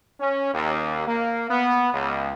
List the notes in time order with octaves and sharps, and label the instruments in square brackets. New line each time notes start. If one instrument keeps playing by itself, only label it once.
[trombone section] C#4
D#2
A#3
B3
C#2